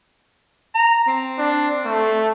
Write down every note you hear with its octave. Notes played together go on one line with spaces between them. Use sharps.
A#5
C4
D4
A3